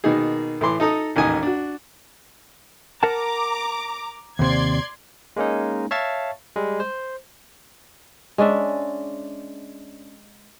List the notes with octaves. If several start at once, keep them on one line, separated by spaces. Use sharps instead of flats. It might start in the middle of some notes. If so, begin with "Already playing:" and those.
B2 D#3 A#3 D#4 G#4
A2 E3 C6 D6
D#4 A4 A#5 D#6
A1 D#2 G#2 G#5 D#6
D4 F#4
A#4 F#5 A5 A#5 D6
D#2 C3 D5 C6 G#6
G#3 A#3 C#4 D#4
C#5 E5 F5 A5 C#6 A6
G3 G#3
C5
G#3 C#4 D4 E5